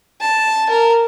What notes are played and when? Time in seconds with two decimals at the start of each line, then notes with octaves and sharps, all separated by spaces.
0.21 A5
0.70 A#4